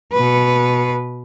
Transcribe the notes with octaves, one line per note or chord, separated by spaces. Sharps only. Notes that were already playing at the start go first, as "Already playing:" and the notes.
B2 B4